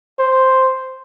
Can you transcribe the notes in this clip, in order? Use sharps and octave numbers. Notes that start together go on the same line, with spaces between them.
C5